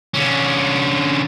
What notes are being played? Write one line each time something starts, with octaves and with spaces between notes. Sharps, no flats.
D3 C#4